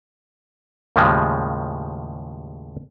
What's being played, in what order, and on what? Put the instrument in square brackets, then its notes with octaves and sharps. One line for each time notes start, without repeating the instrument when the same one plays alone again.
[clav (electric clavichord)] D#2 A2 C#3 F3 G3 G#3